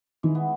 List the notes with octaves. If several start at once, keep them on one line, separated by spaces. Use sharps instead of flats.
D#3 E3 G#3
B3